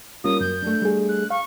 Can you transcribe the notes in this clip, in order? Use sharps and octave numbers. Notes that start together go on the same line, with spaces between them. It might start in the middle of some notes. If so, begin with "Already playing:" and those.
G3 A#3 C#4 F4 D#6
F#2 G6
A3 D4
G3 G#4
F#6
F5 C#6